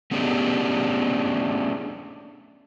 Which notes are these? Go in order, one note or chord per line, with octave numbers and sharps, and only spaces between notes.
A3 B3 C#4 D4 G4 G#4